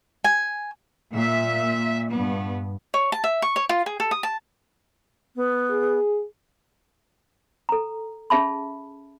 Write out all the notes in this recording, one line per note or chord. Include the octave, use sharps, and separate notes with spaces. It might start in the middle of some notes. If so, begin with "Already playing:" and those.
G#5
A#2 E5
G2 B3
C#5
A5
E5
C#6
C#5
F4
G#4
A4
D#6
A5
B3
G#4
A4 A#5
C#4 G#4 E5 A5 B5